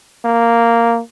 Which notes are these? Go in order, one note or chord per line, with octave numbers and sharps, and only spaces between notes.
A#3